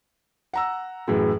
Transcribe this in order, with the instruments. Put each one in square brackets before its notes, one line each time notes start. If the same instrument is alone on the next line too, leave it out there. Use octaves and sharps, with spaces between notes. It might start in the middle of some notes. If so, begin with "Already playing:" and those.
[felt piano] F#5 A#5 E6
[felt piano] F#2 A2 E3 [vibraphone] G#4